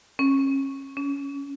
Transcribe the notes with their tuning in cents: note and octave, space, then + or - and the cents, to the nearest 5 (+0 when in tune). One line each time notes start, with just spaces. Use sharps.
C#4 -30
C#4 +20